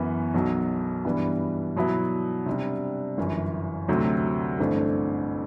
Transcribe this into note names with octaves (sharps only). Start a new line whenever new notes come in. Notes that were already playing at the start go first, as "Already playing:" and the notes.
Already playing: F#2 E3 B3 F#4
B1 B2 F#3
G2 E3 G3 B3
B2 F#3 B3 E4
C3 G3 D4
G1 F#2 E3
D2 C3 F#3
A1 G2 D3 A3 C4